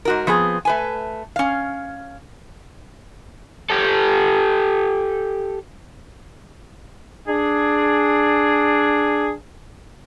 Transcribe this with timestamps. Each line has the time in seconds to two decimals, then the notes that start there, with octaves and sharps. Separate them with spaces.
0.05 G#2 F#4 A#4
0.27 F3 B3 C4 G#4
0.65 A3 B4 G#5
1.36 C#4 F5
3.70 G4 A4
7.27 D4 G#4